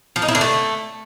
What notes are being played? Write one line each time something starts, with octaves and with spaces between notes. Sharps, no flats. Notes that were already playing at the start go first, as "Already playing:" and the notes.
F3
D#4
E4
D3
A3